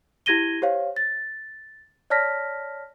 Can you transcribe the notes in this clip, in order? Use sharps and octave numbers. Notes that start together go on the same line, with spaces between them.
E4 G4 G#6 A#6 D#7 G7
G4 C5 C#5 F5
A6
C#5 D5 A5 F6 A#6 B6